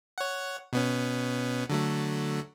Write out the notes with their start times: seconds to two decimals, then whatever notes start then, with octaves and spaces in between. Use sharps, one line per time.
0.18 C#5 F#5
0.73 B2 B3 C#4
1.69 D3 F#3 A3